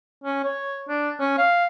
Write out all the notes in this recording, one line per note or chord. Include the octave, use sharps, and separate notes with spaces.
C#4
C#5
D4
C#4
F5